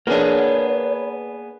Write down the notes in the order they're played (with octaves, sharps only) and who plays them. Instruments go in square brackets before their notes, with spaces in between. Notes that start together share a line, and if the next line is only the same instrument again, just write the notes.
[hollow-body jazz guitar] A#3 D4 [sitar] B3 G#4 [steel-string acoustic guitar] A#4 B4 [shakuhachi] C#5